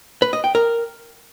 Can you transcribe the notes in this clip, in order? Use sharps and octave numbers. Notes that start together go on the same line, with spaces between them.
B4
D#5
G5
A#4